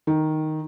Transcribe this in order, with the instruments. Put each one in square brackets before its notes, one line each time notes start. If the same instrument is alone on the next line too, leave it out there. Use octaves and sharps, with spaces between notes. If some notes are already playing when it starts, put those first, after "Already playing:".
[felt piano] D#3